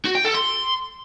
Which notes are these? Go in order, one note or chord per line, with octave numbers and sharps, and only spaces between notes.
F#4
G5
A4
C6